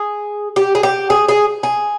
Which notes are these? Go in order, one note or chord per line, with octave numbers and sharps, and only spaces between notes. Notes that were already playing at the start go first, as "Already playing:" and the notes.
Already playing: G#4
G4
G#4
G4
G#4
G#4
G#4